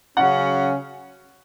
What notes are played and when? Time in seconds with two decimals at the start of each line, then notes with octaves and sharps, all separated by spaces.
0.17 C#3 F#3 C#4 F#5